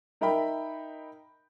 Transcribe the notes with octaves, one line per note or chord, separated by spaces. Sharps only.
D#4 A#4 E5 G5 B5